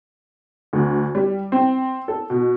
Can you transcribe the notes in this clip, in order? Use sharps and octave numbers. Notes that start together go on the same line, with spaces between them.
D2
G3
C4
A4
B2